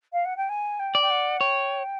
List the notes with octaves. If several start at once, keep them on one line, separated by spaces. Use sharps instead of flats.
F5
F#5
G5
G#5
G5
D5
G5
F#5
C#5 G5